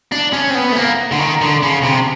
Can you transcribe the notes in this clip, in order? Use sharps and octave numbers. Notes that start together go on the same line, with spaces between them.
D4
C#4
C4
B3
A3
A#3
D3
D#3
D3
C#3
C3